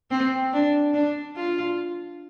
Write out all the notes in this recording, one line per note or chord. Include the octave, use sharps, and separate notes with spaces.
C4
D4
D4
F4